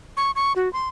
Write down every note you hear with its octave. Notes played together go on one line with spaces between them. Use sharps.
C#6
C#6
F#4
C6